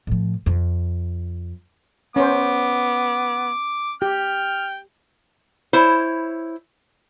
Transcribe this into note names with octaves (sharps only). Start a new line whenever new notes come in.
A2 F3
F2
B3 C#4 C5 D6
G4 G5 F6
E4 C5 C#5